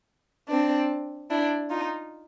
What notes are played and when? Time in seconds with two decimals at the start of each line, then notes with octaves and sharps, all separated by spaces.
0.49 C4 D4
1.30 D4 E4
1.70 D#4 F4